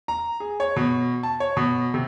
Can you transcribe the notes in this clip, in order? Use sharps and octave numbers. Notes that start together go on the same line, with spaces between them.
A#5
G#4
C#5
B2
A5
C#5
B2
C3